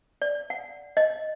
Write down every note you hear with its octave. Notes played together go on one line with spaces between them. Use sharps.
D5
F#5
D#5